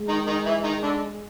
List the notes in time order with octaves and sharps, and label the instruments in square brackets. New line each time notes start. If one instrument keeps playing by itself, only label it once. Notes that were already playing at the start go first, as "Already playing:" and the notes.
Already playing: [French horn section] G#3
[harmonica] D#3 D#4
D#3 D#4
E3 E4
D#3 D#4
D3 D4